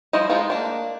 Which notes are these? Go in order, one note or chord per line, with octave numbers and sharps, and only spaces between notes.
F3 G3 E4 C5 D#5
G#3 D#4 F4
A#3 D4